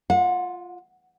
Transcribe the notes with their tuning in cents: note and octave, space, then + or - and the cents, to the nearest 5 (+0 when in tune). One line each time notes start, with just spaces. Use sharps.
F4 +0 F#5 -35